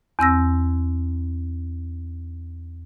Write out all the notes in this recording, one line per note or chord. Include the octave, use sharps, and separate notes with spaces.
E2 C4 E6 A#6